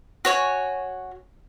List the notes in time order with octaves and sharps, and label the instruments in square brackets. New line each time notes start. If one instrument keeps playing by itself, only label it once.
[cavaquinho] F#4 C#5 G#5